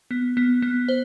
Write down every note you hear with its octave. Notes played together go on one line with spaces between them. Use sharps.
B3
B3
B3
C5